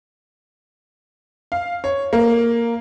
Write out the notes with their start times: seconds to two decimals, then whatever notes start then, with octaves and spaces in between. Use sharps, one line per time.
1.52 F5
1.84 C#5
2.13 A#3